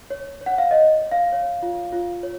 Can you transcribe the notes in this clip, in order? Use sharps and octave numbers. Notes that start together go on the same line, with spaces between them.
C#5
C#5
F#5
F5
C#5 D#5
C#5
F5
C#5
F4
F4
C#5